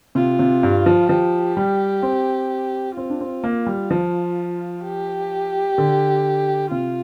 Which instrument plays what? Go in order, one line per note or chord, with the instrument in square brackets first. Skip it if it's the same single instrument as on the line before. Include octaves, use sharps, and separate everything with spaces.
[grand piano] C3 [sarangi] F4
[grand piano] C3
G2
F3
[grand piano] F3 [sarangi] G4
[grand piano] G3
C4
[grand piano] C4 [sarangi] F4
[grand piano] D4
C4
A#3
G3
F3
[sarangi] G4
[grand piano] D3
[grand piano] C3 [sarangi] F4